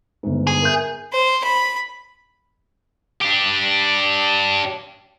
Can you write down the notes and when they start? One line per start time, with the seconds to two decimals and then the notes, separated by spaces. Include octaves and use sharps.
0.23 G1 G#2
0.47 G#4
0.62 A#4 E5 G6
1.12 C5
1.44 B5
3.22 D4 G4